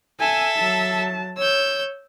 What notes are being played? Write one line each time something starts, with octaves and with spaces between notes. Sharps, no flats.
A4 E5 G#5
F#3 A5
C#5 E6 G6